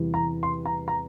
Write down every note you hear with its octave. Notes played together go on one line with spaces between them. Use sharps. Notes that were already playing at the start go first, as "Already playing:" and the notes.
Already playing: E2 C3 E3 G3
A#5
C6
A#5
A#5